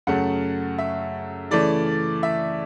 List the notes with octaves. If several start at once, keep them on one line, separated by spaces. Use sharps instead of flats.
F#2 C#3 F#3 A3 F#5
E5
C#3 E3 A3 D5
E5